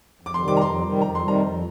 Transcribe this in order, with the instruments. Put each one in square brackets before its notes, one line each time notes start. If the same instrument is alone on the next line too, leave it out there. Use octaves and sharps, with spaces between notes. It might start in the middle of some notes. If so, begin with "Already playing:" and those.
[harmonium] F2 [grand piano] D6
[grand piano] C6
[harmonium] C3 D#3 G3
[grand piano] D6
A#5
[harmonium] F2 [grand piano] C6
[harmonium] C3 D#3 G3
[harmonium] F2 [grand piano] A#5
[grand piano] C6
[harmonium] C3 D#3 G3
[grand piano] A#5
[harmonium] F2